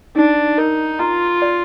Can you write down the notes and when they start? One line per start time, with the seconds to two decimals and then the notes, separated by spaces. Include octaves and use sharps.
0.16 D4 D#4
0.58 D#4 A#4
0.99 F4 A#5
1.42 D5